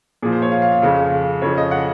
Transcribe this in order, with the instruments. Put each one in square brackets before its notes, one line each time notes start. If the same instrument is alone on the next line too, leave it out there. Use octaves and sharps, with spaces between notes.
[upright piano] A#2 F3 G#4
C5
C#5
F5
F5
F5
F2 C#3 F3 F5
F2 C#3 F3 C#5
D#5
F#5